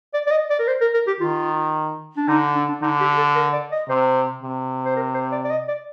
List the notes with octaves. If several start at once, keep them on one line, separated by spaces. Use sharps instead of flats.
D5
D5
D#5
D5
A#4
C5
A#4
A#4
G4
D#3 F4
D4
D3 D#4
D4
D4
D3 D#4
G4
A4
A#4
D5
D#5
C3 C5
C3
C5
A#4
C5
D5
D5
D#5
D5